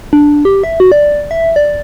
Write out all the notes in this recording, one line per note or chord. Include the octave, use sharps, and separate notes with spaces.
D4
G4
E5
F#4
D5
E5
D5